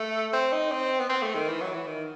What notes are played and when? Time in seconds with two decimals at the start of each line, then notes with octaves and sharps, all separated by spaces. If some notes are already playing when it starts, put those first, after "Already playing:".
Already playing: A3
0.33 C4
0.52 D#4
0.71 C4
1.00 B3
1.09 C4
1.22 A3
1.35 D#3
1.48 E3
1.61 F#3
1.73 E3
1.87 D#3